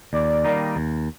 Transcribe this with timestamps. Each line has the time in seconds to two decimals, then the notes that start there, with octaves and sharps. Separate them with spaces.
0.13 D#2 D5
0.45 D#3 G3 A#3 D#4
0.76 D#2